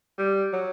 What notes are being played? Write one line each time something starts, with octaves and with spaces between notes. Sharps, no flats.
G3
F#3